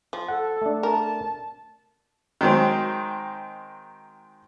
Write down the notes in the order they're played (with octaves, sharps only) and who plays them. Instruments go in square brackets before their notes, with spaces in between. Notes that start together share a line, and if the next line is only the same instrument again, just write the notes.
[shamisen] F3
[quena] A4 [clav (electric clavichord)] F#5
[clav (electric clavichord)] A3 D4
[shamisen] A#4 [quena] A5
[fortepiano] D#3 F#3 G#3 C4